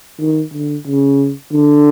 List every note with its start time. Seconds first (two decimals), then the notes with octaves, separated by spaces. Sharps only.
0.20 D#3
0.53 D3
0.86 C#3
1.53 D3